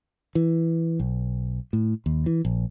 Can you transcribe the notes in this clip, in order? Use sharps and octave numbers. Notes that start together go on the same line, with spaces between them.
E3
B1
A2
D#2
E3
A#1